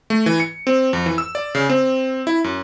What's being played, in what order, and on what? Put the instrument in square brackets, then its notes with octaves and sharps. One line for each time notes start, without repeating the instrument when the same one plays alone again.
[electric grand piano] A3
E3
C#7
C4
F2
E3
E6
D5
C#3
C4
E4
F#2